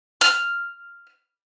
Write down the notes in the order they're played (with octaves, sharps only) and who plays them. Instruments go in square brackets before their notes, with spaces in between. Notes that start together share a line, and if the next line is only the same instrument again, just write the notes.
[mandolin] F6